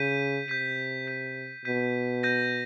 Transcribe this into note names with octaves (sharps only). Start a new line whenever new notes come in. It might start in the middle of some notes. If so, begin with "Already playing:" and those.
Already playing: C#3 G6 B6 D#7
C3 G6 B6 D#7
G6 B6 D#7
B2 G6 B6 D#7
G6 A#6 D#7